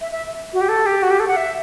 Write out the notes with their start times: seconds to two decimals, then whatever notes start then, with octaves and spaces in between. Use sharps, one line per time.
0.01 E5
0.12 E5
0.53 F#4
0.61 G4
0.69 A4
0.86 G4
1.03 F#4
1.11 G4
1.20 A4
1.28 F#5
1.37 E5